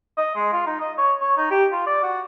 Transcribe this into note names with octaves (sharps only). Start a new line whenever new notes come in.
D#5
G#3
F4
D#4
D#5
C#5
C#5
D#4
G4
F4
D5
F#4